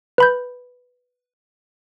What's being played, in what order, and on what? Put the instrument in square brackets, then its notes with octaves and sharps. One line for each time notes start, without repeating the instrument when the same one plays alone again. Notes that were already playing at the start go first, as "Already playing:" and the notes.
[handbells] B4 B5 G6